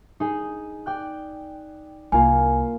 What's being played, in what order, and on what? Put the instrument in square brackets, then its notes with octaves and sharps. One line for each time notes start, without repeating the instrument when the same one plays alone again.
[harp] D#4 G#4
D5 G5 F#6
[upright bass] C2 [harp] A#3 F4 [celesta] G#5